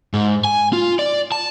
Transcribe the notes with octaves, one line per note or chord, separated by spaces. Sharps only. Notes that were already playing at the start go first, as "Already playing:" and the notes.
G#2
G#5
F4
D5
A5